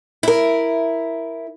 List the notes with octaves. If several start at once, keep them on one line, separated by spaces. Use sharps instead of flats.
E4 A#4